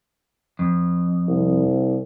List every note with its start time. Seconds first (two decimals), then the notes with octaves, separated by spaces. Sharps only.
0.59 F2
1.28 C2